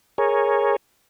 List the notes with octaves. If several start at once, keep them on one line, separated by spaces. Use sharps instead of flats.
G#4 A#4 C#5